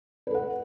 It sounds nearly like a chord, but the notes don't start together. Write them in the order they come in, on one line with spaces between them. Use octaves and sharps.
B4 A4 F#5